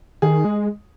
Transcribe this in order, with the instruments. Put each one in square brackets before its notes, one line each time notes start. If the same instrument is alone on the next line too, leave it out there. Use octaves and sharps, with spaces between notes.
[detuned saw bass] D#3 [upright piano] G#4
[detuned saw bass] G#3